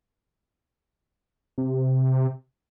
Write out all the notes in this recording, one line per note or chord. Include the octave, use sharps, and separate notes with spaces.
C3